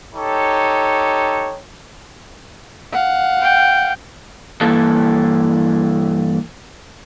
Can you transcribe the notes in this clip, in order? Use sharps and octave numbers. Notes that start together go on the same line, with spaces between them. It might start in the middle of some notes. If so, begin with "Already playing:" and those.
D#4 G4 A4 C#5
F5 F#5
G5
G2 E3 A#3 E4 A4 A5